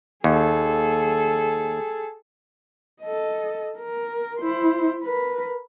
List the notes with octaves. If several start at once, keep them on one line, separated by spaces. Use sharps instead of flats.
D#2 G#4 A4
A4 D#5
A#4
E4 C5
A#4 B4